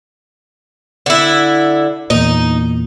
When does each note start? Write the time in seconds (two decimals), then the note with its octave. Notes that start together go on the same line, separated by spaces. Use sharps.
1.06 D3 E4
2.10 E2 A#2 D#4